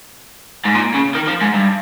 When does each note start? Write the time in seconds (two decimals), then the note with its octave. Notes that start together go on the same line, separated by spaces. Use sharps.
0.66 G#2
0.75 A#2
0.95 C#3
1.15 D#3
1.28 F3
1.42 G#2
1.54 G2